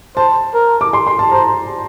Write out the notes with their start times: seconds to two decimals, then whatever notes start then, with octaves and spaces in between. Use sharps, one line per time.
0.17 C5 A5
0.54 A#4
0.81 D6
0.93 C6
1.07 C6
1.19 A5
1.32 C5 A#5